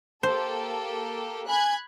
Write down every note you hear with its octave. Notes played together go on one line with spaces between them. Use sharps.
A#3 G4 A4 C5
G#5 B5 F#6 G#6